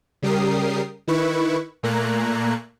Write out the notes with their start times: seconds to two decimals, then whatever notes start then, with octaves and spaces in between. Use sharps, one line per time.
0.22 C#3 G3 G4 A#4 D#6 C7
1.08 D#3 E4 B4 C#6
1.83 A#2 A3 A#3 A#5 F#6 G#6